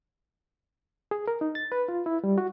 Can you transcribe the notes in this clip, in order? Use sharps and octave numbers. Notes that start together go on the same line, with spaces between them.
G#4
A#4
D#4
A6
B4
F4
E4
G3
F#4